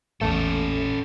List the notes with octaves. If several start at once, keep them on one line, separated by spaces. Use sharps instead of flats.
A1 E2 A3 C#4 A4